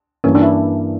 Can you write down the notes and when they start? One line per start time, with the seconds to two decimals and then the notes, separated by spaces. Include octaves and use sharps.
0.24 G2 E3 A#3 C#4
0.35 D4
0.41 E4